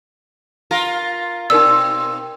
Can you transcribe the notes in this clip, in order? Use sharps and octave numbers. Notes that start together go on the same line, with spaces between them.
F4 A#4
B2 C4 D#4 A#4 D5 E6